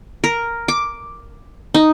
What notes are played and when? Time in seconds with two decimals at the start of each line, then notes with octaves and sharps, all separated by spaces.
0.24 A#4
0.68 D6
1.74 D#4